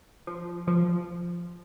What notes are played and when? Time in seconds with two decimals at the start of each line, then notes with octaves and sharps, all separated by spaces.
0.27 F3
0.67 F3